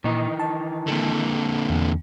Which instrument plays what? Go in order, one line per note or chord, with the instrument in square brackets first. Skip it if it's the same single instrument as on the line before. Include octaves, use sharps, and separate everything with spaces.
[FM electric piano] A#2 [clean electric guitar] D#3 E3 D#4
[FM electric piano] A5
[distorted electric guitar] A#2 D3
[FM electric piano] E2